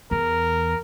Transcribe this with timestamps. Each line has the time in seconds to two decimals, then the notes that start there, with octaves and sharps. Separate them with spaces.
0.11 E2 A#4